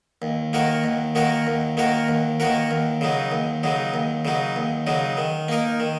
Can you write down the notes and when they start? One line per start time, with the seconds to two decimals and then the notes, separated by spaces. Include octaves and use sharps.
0.22 D#2
0.53 D#3 A#3 F#4 A#4
0.84 D#2
1.15 D#3 A#3 F#4 A#4
1.47 D#2
1.77 D#3 A#3 F#4 A#4
2.08 D#2
2.40 D#3 A#3 F#4 A#4
2.71 D#2
3.01 C#3 F#3 D#4
3.32 D#2
3.63 C#3 F#3 D#4
3.94 D#2
4.25 C#3 F#3 D#4
4.56 D#2
4.87 C#3 F#3 D#4
5.17 D#3
5.48 A#3 D#4 A#4
5.80 D#3